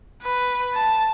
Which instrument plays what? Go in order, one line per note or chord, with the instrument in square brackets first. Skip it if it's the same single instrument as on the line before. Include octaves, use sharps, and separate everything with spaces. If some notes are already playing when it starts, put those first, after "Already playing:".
[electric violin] B4
A5